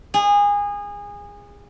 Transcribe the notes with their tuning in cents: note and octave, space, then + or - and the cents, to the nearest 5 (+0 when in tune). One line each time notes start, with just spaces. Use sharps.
G#4 -25